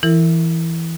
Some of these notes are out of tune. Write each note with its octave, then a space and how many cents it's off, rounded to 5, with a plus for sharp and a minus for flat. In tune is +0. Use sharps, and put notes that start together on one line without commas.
E3 +0 E4 +0 A#4 -25